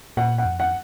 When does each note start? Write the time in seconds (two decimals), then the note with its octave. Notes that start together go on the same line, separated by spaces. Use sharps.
0.17 A#2 F#5
0.38 F#5
0.45 F2
0.60 F#5